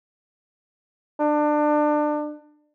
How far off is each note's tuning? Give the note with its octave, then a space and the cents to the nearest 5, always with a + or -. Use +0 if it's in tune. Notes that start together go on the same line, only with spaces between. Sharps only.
D4 +25